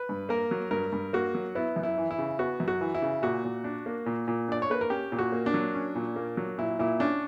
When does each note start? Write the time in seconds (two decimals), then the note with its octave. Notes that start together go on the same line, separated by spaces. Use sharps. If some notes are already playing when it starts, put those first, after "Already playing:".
Already playing: B4
0.09 G2
0.29 A#3 A#4
0.51 F#3
0.71 G2 A#4
0.93 G2
1.13 A#3 F#4
1.35 F#3
1.55 B3 E4
1.76 F#2
1.83 E4
1.98 E3
2.11 E4
2.18 C#3
2.39 B3 F#4
2.60 F#2
2.68 F#4
2.81 E3
2.95 E4
3.02 C#3
3.22 A#2 F#4
3.45 A#2
3.64 D4
3.86 A#3
4.06 A#2
4.28 A#2
4.48 D4 D5
4.62 C#5
4.70 A#3 B4
4.81 A#4
4.90 C#4 G4
5.12 A#2
5.19 F#4
5.32 A#3
5.46 D4
5.54 F#3
5.74 C#4
5.96 A#2
6.16 A#3
6.37 F#3
6.58 A#2 E4
6.79 A#2 E4
7.00 C#4 D4